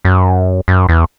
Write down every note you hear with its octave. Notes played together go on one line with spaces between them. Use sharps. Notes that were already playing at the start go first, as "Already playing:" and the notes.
F#2
F#2
E2